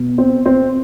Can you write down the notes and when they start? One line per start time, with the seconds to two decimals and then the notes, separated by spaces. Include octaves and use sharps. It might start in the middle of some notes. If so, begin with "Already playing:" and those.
Already playing: B2
0.18 C4
0.46 C4